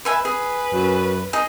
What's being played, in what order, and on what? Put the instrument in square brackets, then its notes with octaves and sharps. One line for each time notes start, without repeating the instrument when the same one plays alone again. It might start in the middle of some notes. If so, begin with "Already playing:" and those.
[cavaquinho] B4 E5 G#5
[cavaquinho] G#4 [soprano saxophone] B4
[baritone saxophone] F#2
[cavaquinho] D#4 G#4